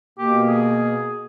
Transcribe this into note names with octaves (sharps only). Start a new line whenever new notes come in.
B2 A#3 G4
G#4